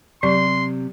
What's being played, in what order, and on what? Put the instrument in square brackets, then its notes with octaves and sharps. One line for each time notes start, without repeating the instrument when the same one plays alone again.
[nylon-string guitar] C3 [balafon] F#3 [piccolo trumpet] C6